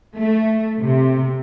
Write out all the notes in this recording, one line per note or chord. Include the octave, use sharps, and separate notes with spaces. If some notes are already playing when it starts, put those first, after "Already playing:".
A3
C3